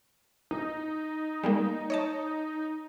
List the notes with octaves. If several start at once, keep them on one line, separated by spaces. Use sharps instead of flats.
D#4
G3 G#3 A#3
C#5 D#5 A5